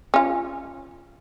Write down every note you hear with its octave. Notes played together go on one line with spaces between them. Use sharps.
C#4 F4